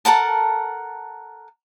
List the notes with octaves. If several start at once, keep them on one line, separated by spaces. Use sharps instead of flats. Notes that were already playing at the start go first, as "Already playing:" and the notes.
A4 A#4 F#5 A5